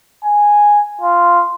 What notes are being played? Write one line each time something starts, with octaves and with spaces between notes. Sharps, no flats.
G#5
F4